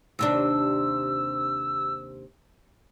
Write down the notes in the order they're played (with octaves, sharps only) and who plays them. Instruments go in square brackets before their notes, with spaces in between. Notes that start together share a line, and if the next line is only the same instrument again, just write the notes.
[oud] D#2 C3 D4 [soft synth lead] E6